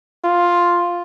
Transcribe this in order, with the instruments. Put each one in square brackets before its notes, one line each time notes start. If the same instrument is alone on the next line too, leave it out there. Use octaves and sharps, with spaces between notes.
[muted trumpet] F4